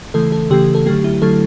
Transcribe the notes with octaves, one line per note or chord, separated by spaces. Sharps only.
C#3 E3 A3 A4
A4
C#3 E3 A3 G4
A4
D3 F#3 A3 G4
E4
D3 F#3 A3 A4